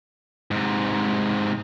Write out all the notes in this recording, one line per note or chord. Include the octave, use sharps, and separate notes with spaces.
G#2 C3